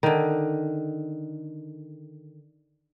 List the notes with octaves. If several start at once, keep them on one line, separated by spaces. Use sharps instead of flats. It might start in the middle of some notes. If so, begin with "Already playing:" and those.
D3 D#3